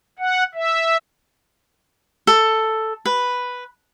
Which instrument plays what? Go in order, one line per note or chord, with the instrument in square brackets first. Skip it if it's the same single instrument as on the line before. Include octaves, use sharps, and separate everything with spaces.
[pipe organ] F#5
E5
[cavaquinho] A4
B4